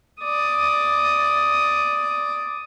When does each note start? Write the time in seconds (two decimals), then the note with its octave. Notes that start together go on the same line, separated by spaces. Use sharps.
0.22 D5 D#6